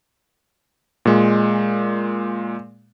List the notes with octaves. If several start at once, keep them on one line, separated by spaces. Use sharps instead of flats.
A#2 G#3